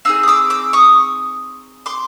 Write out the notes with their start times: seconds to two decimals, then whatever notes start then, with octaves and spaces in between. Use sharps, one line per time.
0.05 C4 D#4 G#4 E6
0.23 D#6
0.28 D6 E6
0.50 D6 E6
0.73 C#6 D#6
1.86 C6 D6